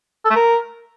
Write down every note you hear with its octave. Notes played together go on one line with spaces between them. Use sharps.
A4
A3
A#4